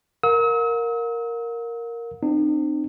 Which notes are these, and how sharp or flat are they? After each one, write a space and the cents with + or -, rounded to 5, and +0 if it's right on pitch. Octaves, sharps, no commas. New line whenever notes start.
A#4 +0 F5 +45 E6 -45
C4 +0 D#4 -45